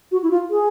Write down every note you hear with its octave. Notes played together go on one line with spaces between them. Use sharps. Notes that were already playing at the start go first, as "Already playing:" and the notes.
F#4
E4
F4
G#4